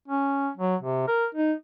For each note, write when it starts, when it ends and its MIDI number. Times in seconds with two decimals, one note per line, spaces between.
0.08 0.50 61
0.57 0.76 54
0.82 1.04 48
1.08 1.26 70
1.35 1.53 63